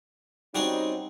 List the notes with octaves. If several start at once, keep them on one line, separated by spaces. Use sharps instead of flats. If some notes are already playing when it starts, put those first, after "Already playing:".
G3 C4 C#4 D#4 F#4 G#4